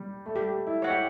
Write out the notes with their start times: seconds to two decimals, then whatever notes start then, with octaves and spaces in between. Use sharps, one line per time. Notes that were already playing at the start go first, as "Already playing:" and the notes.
Already playing: G3
0.26 A3
0.35 G3 G4
0.67 E4
0.82 C#5 F#5
0.90 G4